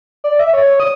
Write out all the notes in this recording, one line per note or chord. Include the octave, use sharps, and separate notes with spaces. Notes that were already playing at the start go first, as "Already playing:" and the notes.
D5
E5
C#5
C#5
D#6